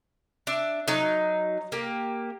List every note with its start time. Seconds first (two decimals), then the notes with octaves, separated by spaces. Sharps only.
0.47 D4 E5
0.88 F#3 D#4
1.72 A#3 G4